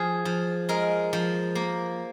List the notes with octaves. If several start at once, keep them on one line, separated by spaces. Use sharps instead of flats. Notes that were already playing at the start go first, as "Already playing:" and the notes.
Already playing: F3 G#4
F3
G#3 A#4
F3
A#3